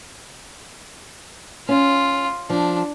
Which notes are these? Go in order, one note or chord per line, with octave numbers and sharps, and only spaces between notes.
C#4 F4
F3 D4